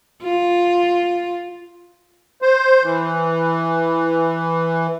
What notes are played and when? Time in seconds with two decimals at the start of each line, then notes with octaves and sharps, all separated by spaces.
0.24 F4
2.42 C5
2.83 E3